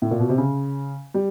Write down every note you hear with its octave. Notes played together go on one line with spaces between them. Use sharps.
A2
A#2
B2
C3
C#3
G3